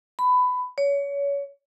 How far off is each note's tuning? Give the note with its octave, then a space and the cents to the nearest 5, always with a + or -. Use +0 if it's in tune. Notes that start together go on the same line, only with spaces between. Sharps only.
B5 +20
C#5 +25